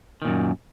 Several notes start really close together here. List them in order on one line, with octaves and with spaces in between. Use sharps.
D#3 A#2 F#2